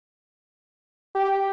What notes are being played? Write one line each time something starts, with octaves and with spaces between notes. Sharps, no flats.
G4